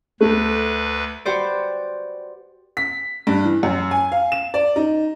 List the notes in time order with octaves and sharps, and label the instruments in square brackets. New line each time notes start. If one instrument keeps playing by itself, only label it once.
[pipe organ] D2 B4 [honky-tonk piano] A3
[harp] F#4 G4 B4 C5 D5
[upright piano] B6
G2
E3
F#2
G#5
F5
E7
D5
D#4